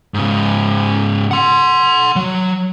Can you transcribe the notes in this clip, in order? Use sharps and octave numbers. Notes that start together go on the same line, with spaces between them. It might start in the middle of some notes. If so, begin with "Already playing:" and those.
G#2 C#3
F#5 C6
F#3